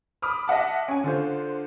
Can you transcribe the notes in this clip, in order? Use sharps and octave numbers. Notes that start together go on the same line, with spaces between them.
B5 D6 D#6 F6
D#5 E5 F#5 A5
C#4 G#5
D3 F4 C5